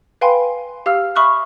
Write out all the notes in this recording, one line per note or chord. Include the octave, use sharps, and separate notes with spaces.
B4 F5 G5 G#5 B5 C6
G4 F5 E6 F6
E5 B5 C#6 D#6 F6 F#6